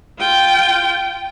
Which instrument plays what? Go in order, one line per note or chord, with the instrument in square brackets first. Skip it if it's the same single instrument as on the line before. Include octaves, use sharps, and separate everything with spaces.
[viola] F4 G5